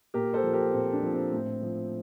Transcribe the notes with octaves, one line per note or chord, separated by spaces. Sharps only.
A#2 G4 A#4
A4 C5
F3
G4 A#4
A#2 C4
D4
F3
C4
A2
F3